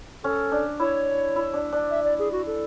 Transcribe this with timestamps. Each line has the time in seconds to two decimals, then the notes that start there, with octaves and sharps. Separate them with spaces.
0.24 C#4 A4
0.52 D4
0.80 E4 C#5
1.36 E4
1.54 D4
1.73 D4
1.90 E5
2.05 D5
2.19 G#4
2.32 F#4
2.47 A4